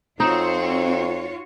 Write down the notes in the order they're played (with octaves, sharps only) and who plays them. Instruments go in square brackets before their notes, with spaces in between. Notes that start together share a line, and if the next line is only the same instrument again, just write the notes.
[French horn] F2 [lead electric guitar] C4 [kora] D#4 [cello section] F4 F#4 C#5